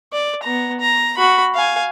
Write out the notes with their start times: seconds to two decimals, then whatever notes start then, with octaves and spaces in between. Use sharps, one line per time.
0.13 D5
0.43 B3 A#5
0.80 A#5
1.17 F#4 B5
1.54 F5 G#5